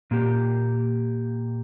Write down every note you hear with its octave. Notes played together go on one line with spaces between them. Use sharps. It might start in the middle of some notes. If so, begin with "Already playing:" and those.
A#2 A#3 G4